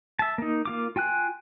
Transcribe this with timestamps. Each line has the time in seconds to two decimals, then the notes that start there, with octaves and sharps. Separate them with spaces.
0.19 E5 A5
0.38 A#3 D#4
0.65 A#3 F4 D6
0.96 F4 G5 G#5 F#6